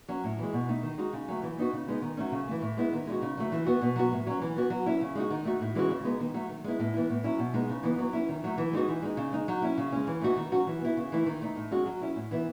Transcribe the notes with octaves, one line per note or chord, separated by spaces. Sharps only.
F#3 C#4
A2
E3 G#3
B2
A3 D#4
D#3
G#3 D#4 F#4
C#3
F#3 A3
E3
B3 D#4 F#4
C#3
G#3 B3 D#4
D#3
F#3 A3 C#4
C#3
E3 A3
A2
G#3 B3 E4
D#3
G#3 D#4 F#4
C#3
F#3 A3
E3
B3 F#4
B2
F#3 B3 F#4
A2
F#3 C#4
E3
B3 F#4
F#3
C#4 E4
C#3
G#3 D#4 F#4
D#3
A3 D#4 F#4
A2
E3 G#3 C#4 F#4
C#3
G#3 B3 D#4
D#3
F#3 A3
D#3
G#3 B3 E4
A2
E3 B3 E4
A2
F#3 C#4 E4
B2
G#3 B3 D#4
C#3
E3 B3 D#4
F#3
C#4 E4
D#3
F#3 A3
E3
G#3 D#4 F#4
E3
G#3 D#4
C#3
G#3 D#4
F#3
C#4 E4
C#3
G#3 C#4
E3
A3 D#4 F#4
D#3
F#3 C#4 F#4
E3
B3 E4
C#3
E3 A3 E4
D#3
A3 D#4
A2
G#3 C#4 F#4
F#3
C#4 E4
A2
E3 B3 E4